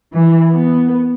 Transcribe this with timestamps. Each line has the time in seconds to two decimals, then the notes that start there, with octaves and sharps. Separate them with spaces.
0.13 E3
0.51 B3